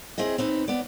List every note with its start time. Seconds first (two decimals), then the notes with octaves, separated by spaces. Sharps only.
0.18 C4 E4 G#4 D#5
0.38 C4 D#4 B4
0.68 B3 D5